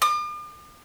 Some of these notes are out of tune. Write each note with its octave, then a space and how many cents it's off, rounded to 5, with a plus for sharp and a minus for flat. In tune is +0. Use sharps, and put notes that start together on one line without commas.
D6 +45